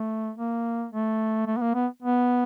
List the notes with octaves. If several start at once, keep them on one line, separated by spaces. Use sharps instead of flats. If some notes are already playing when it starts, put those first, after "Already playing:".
Already playing: A3
A#3
A3
A3
B3
A#3
B3
B3